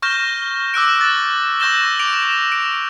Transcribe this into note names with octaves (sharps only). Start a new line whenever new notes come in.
C#6 F6 G6 A#6 E7 G7
D6 E6 F#6 D7
A6
C#6 E6 G6 A#6 E7 G7
D6 D7 F7
D7